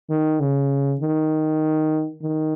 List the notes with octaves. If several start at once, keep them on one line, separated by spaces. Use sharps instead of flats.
D#3
C#3
D#3
D#3